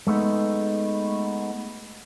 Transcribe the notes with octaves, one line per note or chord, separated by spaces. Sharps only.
G#3 A3 B3 D#4